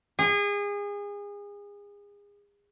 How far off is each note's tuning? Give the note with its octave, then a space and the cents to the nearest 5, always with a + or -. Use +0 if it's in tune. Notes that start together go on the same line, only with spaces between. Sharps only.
G#4 -30